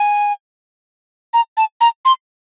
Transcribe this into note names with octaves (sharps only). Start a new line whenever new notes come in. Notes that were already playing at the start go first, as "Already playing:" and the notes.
Already playing: G#5
A#5
A5
A#5
C6